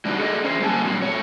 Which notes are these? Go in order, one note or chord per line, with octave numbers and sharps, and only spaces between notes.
F#3 G3 D4 D#4 F#4
G#4 A4 D5 D#5
C#4 G#4 C5
G3 A#3 F#4 G#5 A5
A#2 F#3 G3 C4
G2 B2 A3 C#5